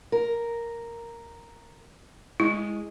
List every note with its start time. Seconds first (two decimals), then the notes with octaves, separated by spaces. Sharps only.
0.12 A#4
2.40 G#3 E4